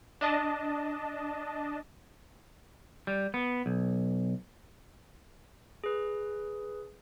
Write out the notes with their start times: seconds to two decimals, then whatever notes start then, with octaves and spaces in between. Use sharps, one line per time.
0.21 D4 D#5 A5
3.07 G3
3.34 B3
3.66 B1
5.84 G#4 B4